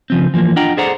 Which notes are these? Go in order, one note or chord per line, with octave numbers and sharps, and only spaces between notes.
C#3 F3 C4
E3 F3 A#3
D4 F4 D#5 F#5 G5 A#5
G#4 A4 C5 D5 F#5 A#5